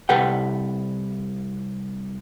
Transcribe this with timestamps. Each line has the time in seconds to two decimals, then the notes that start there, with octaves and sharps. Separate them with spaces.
0.09 C2 C3 A4 B4 F#5 G5